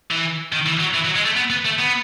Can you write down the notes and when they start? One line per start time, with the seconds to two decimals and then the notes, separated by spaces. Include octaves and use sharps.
0.11 E3
0.53 D#3
0.67 E3
0.80 F#3
0.94 E3
1.05 F#3
1.16 G#3
1.25 A3
1.36 B3
1.50 B3
1.65 A3
1.79 B3